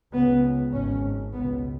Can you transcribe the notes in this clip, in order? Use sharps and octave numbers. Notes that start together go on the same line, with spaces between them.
C#2 C#3 B3
G#1 G#2 C#4
C#2 B2 B3